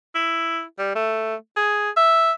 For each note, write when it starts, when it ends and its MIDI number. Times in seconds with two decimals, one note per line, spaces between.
0.15 0.62 64
0.79 0.93 55
0.95 1.35 57
1.57 1.90 68
1.97 2.32 76